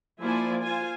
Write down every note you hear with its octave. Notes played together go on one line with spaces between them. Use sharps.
F3 A#3 E4 C5 D5 G#5
F4 C5 G#5